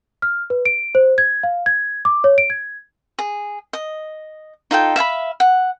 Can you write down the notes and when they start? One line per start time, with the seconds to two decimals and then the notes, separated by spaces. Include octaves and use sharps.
0.22 F6
0.50 B4
0.65 D7
0.95 C5
1.18 G#6
1.43 F5
1.66 G#6
2.05 D6
2.24 C#5
2.38 D7
2.50 G#6
3.19 G#4
3.73 D#5
4.71 D#4 F4 A4 G5
4.96 E5 F5 G#5 B5
5.40 F#5